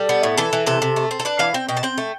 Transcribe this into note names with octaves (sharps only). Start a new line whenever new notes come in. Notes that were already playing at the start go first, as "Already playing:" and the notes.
Already playing: G3 A4
B3
A2
E3 A4
E3
C3 A4
C3
A3
C4
A4
D4 B4
E3 F5
C4 G5
B2 G5
A5
C4 G5
A3